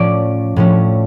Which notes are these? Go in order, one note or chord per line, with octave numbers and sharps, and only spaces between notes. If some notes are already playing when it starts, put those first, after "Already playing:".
Already playing: A2 F3 A3 C#4 D5
A2 F3 A3 C#4